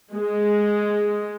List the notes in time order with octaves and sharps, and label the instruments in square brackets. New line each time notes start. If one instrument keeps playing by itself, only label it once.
[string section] G#3